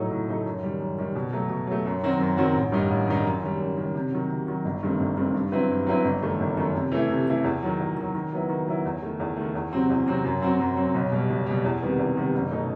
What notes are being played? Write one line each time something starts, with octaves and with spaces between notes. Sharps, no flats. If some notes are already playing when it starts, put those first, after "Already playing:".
Already playing: A2 F#3 A3 D#4 A4
A2
F#3 A3 D#4 A4
F#2
D#3 G3
F#2
D#3 G3
B2
F#3 A3
B2
F#3 A3
F#2
D#3 F#3 C4 F#4
F#2
D#3 F#3 C4 F#4
A1
G2 D#3 G3 D#4
A1
G2 D#3 G3 D#4
F#2
D#3 G3
F#2
D#3 G3
C3
D#3 F#3
C3
D#3 F#3
G1
G2 D#3 A3 C4
G1
G2 D#3 A3 C4
G2
F#3 C4 E4 B4
G2
F#3 C4 E4 B4
G1
F#2 D#3 A3
G1
F#2 D#3 A3
C3
E3 A3 E4
C3
E3 A3 E4
E2
D#3 F#3
E2
D#3 F#3
D#3
F#3 B3 E4
D#3
F#3 B3 E4
E2
D#3 A3
E2
D#3 A3
E2
C3 F#3 C4 F#4
E2
C3 F#3 C4 F#4
F#2
F#3 C4 F#4
F#2
F#3 C4 F#4
B1
B2 G3
B1
B2 G3
E2
C3 D#3 G3 B3
E2
C3 D#3 G3 B3
F#1
B2 A3 D#4